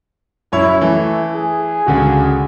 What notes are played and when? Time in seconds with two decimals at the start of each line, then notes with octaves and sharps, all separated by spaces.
0.53 F#2 E4 C#5
0.81 E3 A3
1.35 G#4
1.86 C#2 D3 F#4